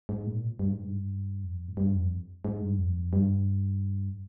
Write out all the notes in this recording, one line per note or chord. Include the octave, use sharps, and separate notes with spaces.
G#2
A#2
G2
G#2
G2
F2
G#2
G2
F2
G#2
G2
F2
G2